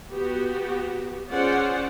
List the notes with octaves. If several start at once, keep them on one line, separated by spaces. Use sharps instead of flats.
B3 F#4 G4
C#4 F4 G#4 C5 D5 F#5